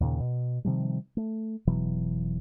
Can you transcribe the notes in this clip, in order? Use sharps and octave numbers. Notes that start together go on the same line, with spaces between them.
D#2 A#2 C#3
B2
C3 D#3 F3 G3
A3
F1 B2 E3 F#3